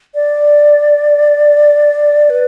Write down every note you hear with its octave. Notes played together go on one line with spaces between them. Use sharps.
D5
B4